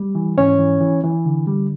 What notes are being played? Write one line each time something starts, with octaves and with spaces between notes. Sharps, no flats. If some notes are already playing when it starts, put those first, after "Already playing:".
Already playing: G3
E3
G#2 C#4 C#5
E3
E3
E3
D3
G3